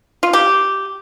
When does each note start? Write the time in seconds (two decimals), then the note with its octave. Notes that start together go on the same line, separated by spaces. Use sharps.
0.23 F4
0.33 G4